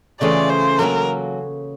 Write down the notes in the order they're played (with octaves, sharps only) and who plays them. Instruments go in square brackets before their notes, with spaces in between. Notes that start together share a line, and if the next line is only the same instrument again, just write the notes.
[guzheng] C#3 E3 A3 C#4 F4 [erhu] D5
[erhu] C5
[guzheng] F#3 A#3 C#4 F#4 A4 [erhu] A#4